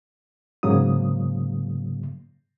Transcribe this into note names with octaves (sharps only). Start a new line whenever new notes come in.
G#2 C#3 F#3 A#3 D#6